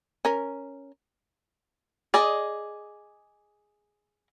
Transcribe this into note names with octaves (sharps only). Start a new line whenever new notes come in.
C#4 A#4
G#4 D5 D#5